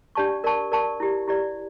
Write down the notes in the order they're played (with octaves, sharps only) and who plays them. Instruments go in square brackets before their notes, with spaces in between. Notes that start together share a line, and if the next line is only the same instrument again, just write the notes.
[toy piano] D4 G4 D5 A5 C#6
A#4 D5 A5 C#6
A#4 D5 A5 C#6
E4 G4 D5
E4 G4 D5